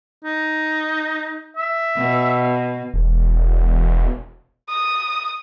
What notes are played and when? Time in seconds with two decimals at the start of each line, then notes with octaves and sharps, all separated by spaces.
0.24 D#4
1.57 E5
1.96 B2
2.94 E1
4.69 D#6